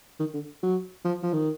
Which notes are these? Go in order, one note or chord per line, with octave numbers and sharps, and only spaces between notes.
D#3
D3
F#3
F3
F3
D#3